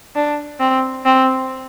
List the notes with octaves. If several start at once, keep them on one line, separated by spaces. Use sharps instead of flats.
D4
C4
C4